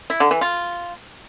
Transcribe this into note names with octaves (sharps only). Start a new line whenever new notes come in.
E4
D3
E3
F4